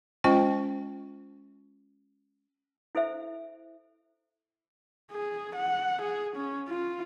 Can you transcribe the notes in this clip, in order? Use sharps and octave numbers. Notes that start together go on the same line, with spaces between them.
G#3 C#4 F4 C5 D#5 G5
E4 A4 C5 E5
G#4
F#5
G#4
C#4
F4